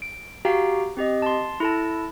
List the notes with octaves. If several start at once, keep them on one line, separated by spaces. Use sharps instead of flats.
D7
F#4 G4 F5 G5 A#5
C4 G4 D#5
A5 C6
E4 A4 A5